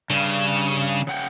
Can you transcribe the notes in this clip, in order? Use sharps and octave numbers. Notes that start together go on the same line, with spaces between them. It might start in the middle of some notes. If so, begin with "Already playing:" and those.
G2 C#3
C#3 F#5 G5